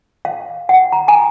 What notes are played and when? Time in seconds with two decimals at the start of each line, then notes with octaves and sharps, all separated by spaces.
0.25 F5
0.69 F#5
0.92 A#5
1.08 G#5